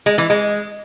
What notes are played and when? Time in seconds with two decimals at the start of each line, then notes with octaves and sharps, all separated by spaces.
0.06 G#3
0.18 E3
0.30 G#3